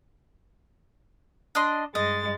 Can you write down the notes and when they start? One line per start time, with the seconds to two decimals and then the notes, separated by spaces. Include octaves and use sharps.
1.55 D4 D#5 C6
1.95 G2 G#3 D#5 A6